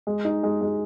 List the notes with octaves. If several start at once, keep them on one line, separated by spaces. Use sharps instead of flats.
G#3
D#4
G#3
G#3